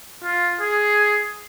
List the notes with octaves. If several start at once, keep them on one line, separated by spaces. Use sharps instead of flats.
F4
G#4